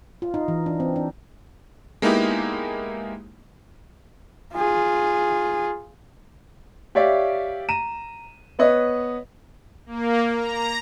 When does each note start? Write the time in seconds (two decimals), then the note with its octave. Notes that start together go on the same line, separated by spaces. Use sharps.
0.22 F4
0.34 D#4
0.48 E3
0.66 D4
0.80 C4
0.96 D4
2.02 G#3 A#3 B3 D#4 E4 G4
4.54 F4 G#4
6.95 G4 C#5 D5 E5 F5
7.69 A#5 D#7 E7
8.59 B3 B4 C#5 D#5
9.86 A#3
10.35 A#5